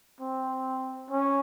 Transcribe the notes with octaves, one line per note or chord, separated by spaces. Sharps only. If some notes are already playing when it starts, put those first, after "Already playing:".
C4
C#4